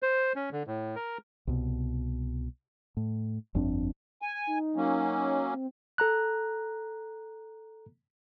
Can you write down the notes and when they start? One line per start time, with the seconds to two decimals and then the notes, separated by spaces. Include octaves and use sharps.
0.03 C5
0.36 C#4
0.52 D3
0.67 A2
0.96 A#4
1.47 C2 B2
2.97 A2
3.55 G1 F2 C4 D4
4.22 G#5
4.47 D#4
4.76 F#3 A#3 C#4
5.53 C4
5.98 A4 A#5 F#6